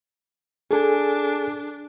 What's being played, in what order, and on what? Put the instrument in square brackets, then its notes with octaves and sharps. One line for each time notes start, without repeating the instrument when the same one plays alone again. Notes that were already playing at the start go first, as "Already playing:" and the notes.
[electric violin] D4 [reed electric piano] G#4 A4 G#5